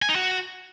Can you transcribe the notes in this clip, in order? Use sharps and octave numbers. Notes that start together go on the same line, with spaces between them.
G#5
D#4
F#4